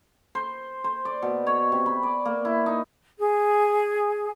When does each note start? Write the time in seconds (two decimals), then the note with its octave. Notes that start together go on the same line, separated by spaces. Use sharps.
0.35 C5
0.84 C5
1.05 D5
1.22 B2
1.47 C#5
1.72 C3
1.86 B5
2.03 D5
2.25 A#3
2.45 E4
2.66 D#4
3.19 G#4